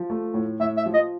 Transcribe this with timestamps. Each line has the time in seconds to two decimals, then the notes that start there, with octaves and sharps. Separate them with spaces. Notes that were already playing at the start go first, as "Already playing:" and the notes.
Already playing: F3
0.10 A3
0.34 A2
0.60 A2 E5
0.77 E5
0.86 F3
0.94 D#5